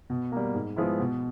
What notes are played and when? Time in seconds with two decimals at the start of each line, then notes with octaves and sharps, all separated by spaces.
0.10 B2
0.32 G3 A#3
0.54 G#2
0.76 F3 G#3 B3 E4
1.00 B2